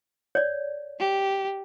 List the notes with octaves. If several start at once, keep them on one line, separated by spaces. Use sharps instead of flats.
C#5 D5
G4